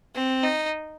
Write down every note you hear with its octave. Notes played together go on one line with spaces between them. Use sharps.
C4
D#4